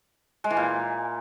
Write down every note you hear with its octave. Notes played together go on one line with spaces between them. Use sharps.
G#3
E3
A#2